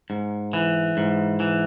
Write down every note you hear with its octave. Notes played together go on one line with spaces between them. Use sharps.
G#2
E3
G#2
E3